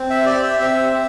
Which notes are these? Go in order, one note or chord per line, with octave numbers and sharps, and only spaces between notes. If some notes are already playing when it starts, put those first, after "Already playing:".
Already playing: C4
E5
G4 D5
E5
C4 E5
C4